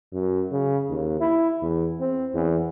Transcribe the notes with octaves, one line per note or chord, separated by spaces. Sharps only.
F#2
C#3
D#2
E4
E2
C4
E2